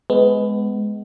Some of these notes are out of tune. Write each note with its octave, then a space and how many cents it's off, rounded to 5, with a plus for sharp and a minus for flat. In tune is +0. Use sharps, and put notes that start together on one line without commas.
G#3 +15 B3 +20